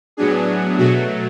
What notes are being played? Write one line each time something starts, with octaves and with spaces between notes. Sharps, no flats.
A2 F#3 B3 D4 G#4
B2 F#3 A3 F#4